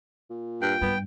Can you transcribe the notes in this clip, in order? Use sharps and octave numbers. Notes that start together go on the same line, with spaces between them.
A#2
G2 G5
G2 B3